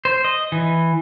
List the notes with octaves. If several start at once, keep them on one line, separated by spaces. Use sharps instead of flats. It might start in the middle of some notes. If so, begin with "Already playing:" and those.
C5
D#5
E3